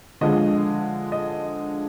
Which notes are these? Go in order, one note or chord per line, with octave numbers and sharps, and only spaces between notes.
D3 F3 G#3 D#5
D#5